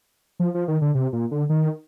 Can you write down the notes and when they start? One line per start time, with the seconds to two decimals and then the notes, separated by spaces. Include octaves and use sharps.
0.40 F3
0.54 F3
0.68 D#3
0.82 D3
0.95 C3
1.13 A#2
1.31 D3
1.49 D#3